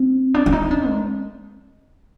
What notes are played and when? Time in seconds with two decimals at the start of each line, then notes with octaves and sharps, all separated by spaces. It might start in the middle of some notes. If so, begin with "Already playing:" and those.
Already playing: C4
0.34 D4
0.46 D4
0.52 D#4
0.71 D4
0.88 G#3